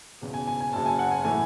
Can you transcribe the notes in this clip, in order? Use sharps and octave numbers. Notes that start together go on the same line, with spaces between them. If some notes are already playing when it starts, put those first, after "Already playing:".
E1 E2 C#3
G#5
G#5
G#5
F#1 F#2 C#3 A5
G#5
F#5
G#5
A2 E3 A3 G#5